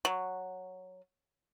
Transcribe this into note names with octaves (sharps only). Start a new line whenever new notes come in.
F#3